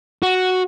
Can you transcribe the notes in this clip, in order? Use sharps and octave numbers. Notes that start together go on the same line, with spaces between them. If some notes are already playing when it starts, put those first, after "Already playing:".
F#4